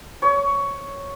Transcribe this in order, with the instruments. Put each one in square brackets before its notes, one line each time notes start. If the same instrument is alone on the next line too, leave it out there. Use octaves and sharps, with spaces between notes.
[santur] C#5